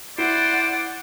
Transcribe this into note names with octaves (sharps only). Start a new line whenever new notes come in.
E4 C5 D5 F#5 D7